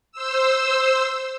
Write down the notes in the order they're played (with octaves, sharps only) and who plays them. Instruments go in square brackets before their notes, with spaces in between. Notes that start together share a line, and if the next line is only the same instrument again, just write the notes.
[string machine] C5 E6